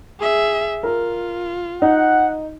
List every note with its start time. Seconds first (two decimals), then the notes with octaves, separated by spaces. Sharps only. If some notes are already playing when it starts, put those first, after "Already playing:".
0.19 G#4 E5
0.83 F4 A#4
1.82 D#4 F#5